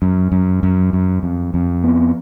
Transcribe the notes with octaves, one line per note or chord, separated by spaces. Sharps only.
F#2
F#2
F#2
F#2
F2
F2
B3